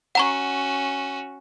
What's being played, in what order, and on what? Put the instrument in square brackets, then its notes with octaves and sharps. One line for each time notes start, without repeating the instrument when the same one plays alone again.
[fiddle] C#4 F#4 [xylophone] F#5 A#5 C#6